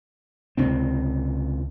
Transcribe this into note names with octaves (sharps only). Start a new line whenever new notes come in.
C#2 C3 C4